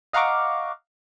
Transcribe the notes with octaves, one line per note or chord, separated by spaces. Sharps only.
D#5 F5 F#5 A#5 C#6 D6